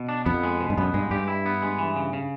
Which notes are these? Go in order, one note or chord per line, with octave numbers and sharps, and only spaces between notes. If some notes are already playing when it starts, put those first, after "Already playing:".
Already playing: B2
D4
F2 B3
G#3
B2
G2
F#2 B3
G2 G#3
G2 G4
E4
B3
G#3
E3
C#3
C#3